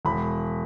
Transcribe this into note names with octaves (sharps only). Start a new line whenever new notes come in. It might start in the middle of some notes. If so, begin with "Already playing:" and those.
E1 B5